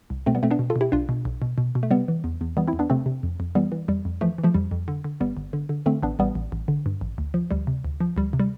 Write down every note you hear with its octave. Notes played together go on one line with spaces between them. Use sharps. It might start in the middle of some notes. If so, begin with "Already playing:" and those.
C2
B2 A3 C4
G3 B3
B2 A3 C4
B3 D4
B2
F4 A4
B2
E4 G4
B1 D4 F4
B2
B1
B2
B2
B2
A3
C3 G3 B3
E3
E2
E2
E3 G3 B3
C4 E4
E2
B3 D4
C3 A3 C4
C3
F2
F2
E3 G3 B3
E3
F2 G3
F2
E3 F3 A3
E3
F3 A3
F2 G3
F2
D3
D3
G1 G3 B3
G1
D3
D3
D3 A3 C4
A1 B3 D4
A1 G3 B3
A1
A1
D3
G2
A1
D2
F3
D2 G3
C3
D2
F3
D2 G3
C3
G3